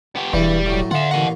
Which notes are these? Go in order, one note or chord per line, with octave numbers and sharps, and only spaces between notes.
B3 G4
E1 E2 G2 E3 G3
A2 F#3
D3 F4 E5 F#5
A1 A#2 D#5 F#5 A#5